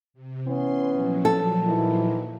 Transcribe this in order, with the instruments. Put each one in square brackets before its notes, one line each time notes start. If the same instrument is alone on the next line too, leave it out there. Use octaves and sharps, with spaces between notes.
[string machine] C3
[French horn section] E3 B3 C#4 [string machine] C6
[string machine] A#2 F3 F#3
[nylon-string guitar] A4
[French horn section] D#3 E3 E4